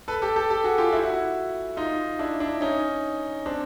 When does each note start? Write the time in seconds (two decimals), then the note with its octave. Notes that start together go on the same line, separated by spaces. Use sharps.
0.08 A4 B4
0.22 G4 A4
0.36 G4 A4
0.50 G4 A4
0.64 F#4 G#4
0.78 F4 G4
0.92 E4 F#4
1.03 E4 F#4
1.14 E4 F#4
1.77 D#4 F4
2.19 D4 E4
2.40 D4 E4
2.61 C#4 D#4
3.46 C4 D4